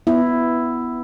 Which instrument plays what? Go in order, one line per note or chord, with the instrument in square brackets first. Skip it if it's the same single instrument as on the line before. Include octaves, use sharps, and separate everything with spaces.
[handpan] B3 E4